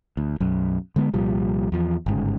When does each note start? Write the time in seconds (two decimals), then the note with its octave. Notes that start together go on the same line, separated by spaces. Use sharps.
0.17 D2
0.40 B1 F#2
0.96 D3 G#3 B3
1.14 C2 A#2 F3 G3
1.72 E2 F3
2.06 G1 G#2 C#3